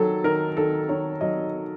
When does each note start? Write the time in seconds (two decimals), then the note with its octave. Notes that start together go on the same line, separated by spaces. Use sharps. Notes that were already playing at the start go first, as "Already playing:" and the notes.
Already playing: D#3 F#3 A4
0.24 D#3 A#4
0.57 D#3 A4
0.89 D#3 C#5
1.21 F#3 D#5